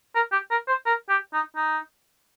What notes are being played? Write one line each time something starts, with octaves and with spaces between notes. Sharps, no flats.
A#4
G4
A#4
C5
A#4
G4
D#4
D#4